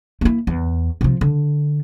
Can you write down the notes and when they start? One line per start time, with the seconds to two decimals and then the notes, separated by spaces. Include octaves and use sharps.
0.21 A#3 E4
0.47 E2
1.01 C3 F3
1.21 D3